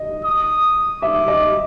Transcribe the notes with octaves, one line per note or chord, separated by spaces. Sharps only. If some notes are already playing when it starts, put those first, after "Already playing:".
Already playing: D#5
D#6
E5 D6
D#5